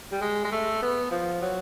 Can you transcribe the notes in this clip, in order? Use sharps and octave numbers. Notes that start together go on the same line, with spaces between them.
G3
G#3
G#3
A3
B3
F3
F#3